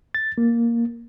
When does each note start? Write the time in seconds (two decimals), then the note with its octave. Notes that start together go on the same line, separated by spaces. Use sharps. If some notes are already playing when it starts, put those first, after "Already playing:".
0.15 A6
0.38 A#3